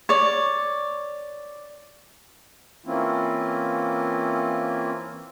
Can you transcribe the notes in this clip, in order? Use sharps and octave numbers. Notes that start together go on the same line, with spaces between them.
C#5 D5
E3 A#3 C4 C#4 E4 F4